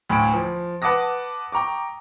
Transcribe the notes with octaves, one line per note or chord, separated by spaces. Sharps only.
D2 A2 B5 C#6 D7
F3
B4 F#5 A5 D6 D#6 A#6
G5 A#5 C#6 D6